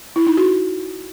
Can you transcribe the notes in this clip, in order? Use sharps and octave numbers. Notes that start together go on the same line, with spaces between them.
E4
D#4
F#4